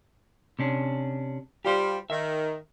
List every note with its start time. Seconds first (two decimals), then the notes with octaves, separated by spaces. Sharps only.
0.59 C3 C#4 D4
1.65 G3 F4 G4 C5
2.10 D#3 E5